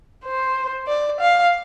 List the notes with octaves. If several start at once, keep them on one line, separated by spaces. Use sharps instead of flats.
C5
D5
F5